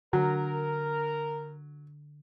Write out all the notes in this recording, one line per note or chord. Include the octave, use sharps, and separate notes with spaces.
D3 F#3 A#4